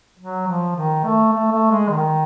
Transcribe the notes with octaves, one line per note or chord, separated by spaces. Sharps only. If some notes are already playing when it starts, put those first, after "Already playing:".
F#3
F3
D#3
A3
A3
A3
G#3
D#3